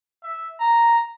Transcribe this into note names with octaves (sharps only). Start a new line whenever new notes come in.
E5
A#5